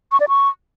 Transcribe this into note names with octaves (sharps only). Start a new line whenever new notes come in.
C#6
D5
C#6